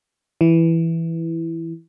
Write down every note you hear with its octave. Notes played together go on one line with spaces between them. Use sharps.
E3